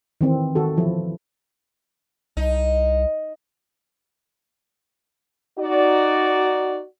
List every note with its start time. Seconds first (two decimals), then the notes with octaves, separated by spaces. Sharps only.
0.21 D#3 E3 C4
0.55 D#3 F#4 A4
0.77 E3 F3 E4
2.37 C2 D#4
5.59 D#4 F#4 D5